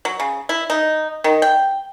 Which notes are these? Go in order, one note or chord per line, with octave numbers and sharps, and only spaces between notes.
F#3
C#3
E4
D#4
D#3
G5